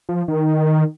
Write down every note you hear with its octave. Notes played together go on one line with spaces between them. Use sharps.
F3
D#3